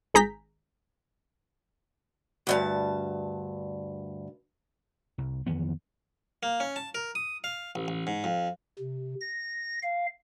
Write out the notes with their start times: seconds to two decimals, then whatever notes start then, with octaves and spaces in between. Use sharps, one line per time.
0.14 G#1 G#4 A#5 G6 B6
2.47 D2 G2 A5
5.18 C2
5.46 F2 D#3 E3 B3
6.43 A#3
6.60 C#4
6.76 A5
6.95 A#4
7.15 D#6
7.44 F5
7.75 A1
7.88 A1
8.07 G#2
8.24 F2
8.79 C3
9.21 A#6
9.83 F5